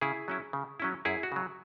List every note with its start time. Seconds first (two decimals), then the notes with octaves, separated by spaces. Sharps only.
0.01 C#3 E4 G#4
0.28 F#3 C#4 E4
0.53 C#3
0.80 F#3 C#4 E4
1.05 F#2 E4 G#4
1.23 F#4
1.32 C#3 F#3